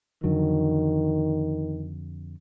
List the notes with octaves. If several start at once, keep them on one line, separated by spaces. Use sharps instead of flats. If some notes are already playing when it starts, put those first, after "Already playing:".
F2 D3 D#3 F#3